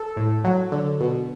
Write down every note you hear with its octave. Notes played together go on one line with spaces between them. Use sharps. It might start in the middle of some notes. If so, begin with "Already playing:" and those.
Already playing: A4
A2
F#3
D3
B2